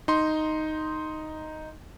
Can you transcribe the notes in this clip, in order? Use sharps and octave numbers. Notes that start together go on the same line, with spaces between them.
D#4 C6